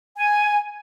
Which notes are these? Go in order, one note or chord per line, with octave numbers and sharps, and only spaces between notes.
G#5